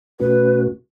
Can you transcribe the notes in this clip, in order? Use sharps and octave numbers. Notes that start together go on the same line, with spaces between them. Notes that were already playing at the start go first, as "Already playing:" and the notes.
B2 A3 C#4 F#4 B4